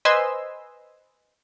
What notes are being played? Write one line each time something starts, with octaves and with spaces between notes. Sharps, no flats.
B4 C5 D#5 G#5 C6 E6